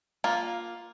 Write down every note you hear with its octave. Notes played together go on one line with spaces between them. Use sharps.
A#3 F4